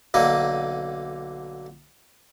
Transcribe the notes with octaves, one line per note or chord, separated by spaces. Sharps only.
B1 D3 A#3